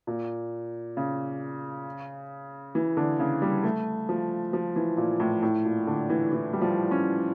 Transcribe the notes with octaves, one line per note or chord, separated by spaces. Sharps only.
A#2
C#3
E3
D3
C#3
G3
A3
F3
F3
E3
A#2
A2
A2
A#2
D3
E3
E3
G3
F3
C#4